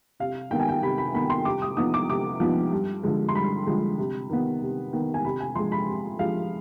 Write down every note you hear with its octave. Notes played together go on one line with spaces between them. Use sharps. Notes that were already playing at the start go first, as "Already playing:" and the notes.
C3 F5
D#3 B3 G5
G#5
G5
C3 B5
B5
D#3 B3 B5
C6
C3 D6
D#6
F3 B3 D#4 D#6
D6
C3 D6
F3 B3 D#4
G2
D3 F3 G#3
C6
G2 B5
D3 F3 G#3
C3
D#3 B3
C3
D#3 B3
G#5
C3 B5
G#5
F3 G#3 C6
B5
C3
F3 G#3 F5